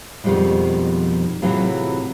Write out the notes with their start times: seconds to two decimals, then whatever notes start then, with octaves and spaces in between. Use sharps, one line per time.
0.24 F2 B2 D#3 F3 G3 G#3
1.42 A2 C3 E3 F#3 F4 G#4